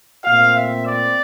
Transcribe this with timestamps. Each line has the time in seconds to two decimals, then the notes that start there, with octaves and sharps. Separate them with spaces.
0.24 A#2 A3 C4 F5
0.54 E5
0.85 D5